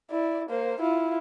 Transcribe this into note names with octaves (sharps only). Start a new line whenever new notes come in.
E4 D5
A#3 C5
E4 F4